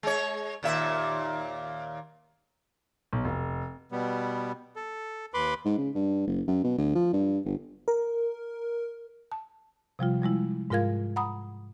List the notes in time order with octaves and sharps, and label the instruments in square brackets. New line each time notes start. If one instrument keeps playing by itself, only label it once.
[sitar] G#3 C#5
D#2 A#2 E5
[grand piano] B1
F1
[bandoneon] B2 G3 B3
A4
D#2 B4 B5 C6 D6
[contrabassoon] G#2
C#3
G2
F#1
F#2
B2
D2
F3
G2
G1
[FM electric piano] A#4
[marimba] A5
C3 F3 G3 F4
F3 G3 G#3 E4
G#2 G#3 F4 A#4 F5 G#6
F#5 A#5 B5 D#6